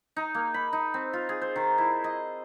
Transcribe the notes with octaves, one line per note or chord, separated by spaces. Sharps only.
D#4
A#3
B5
D#4
C4
F4
G#4
C5
D#3
E4
D#5